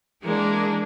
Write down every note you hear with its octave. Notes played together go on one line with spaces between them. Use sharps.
E3 G#3 A#3 D4